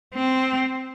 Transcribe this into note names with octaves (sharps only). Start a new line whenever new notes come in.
C4